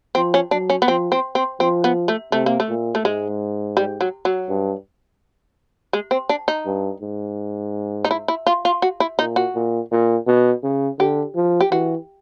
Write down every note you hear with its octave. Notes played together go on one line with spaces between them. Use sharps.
F3 C4
C#4
F#3 D4
C#4
B3
F3 C4
C4
C4
F3 C4
B3
A3
C3 A3
A#3
A3
A#2
A3
G#2 G#3
G3
F#3
F#3
G2
G#3
C4
D4
D#4
G2
G#2
D#4
E4
E4
F4
F4
F#4
E4
A#2 D#4
F#4
A#2
A#2
B2
C#3
D3 G4
F3
G4
E3 F#4